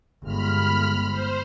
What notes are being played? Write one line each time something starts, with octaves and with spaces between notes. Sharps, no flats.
G1 G#3 B5 F6
C5